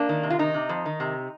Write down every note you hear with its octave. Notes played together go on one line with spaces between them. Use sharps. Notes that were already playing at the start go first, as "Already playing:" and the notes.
Already playing: A#3 D4
D#3
C3
F4
D#3 D#4
C3
F2
D#3
C3